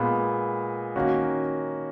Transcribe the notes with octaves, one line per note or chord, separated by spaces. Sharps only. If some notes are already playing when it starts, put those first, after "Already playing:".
Already playing: A#2 G#3 B3
D#3 A#3 C#4 F#4